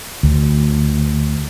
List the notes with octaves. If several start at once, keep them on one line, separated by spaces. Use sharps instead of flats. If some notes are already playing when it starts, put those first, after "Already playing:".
D2